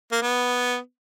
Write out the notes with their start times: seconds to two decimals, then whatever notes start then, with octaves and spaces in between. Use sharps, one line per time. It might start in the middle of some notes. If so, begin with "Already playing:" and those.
0.12 A#3
0.22 B3